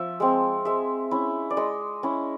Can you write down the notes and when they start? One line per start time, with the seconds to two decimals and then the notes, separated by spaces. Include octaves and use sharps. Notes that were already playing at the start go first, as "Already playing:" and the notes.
Already playing: F3 E5
0.20 G#3 C4
0.65 G#3 E5
1.11 C#4 E4
1.50 D5
1.57 G#3 D#5
2.03 C#4 E4